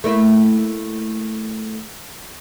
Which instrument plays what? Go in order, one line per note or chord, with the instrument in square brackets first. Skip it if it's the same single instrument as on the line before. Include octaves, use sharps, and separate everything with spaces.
[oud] A3 A#3 E4